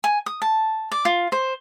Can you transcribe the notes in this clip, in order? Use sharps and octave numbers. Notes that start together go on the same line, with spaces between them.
G#5
D#6
A5
D5
F4
C5